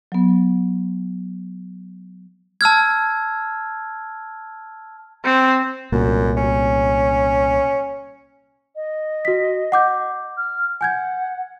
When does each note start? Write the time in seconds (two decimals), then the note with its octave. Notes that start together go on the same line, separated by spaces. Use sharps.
0.12 F#3 B3
2.61 A5 E6 F6 G#6
5.25 C4
5.92 C2 F#2 A#2
6.37 C#4
8.75 D#5
9.25 F#4 B6
9.72 F#5 D6 G6
10.37 F6
10.81 F#5 G#5 G6 G#6